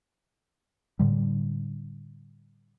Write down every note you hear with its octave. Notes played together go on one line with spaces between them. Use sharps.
A2 D3 G3